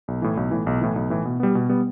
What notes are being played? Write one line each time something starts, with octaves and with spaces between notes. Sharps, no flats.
B1
A2 E3
B1
A2 E3
B1
A2 E3
B1
A2 E3
B2
G3 B3
B2
G3 B3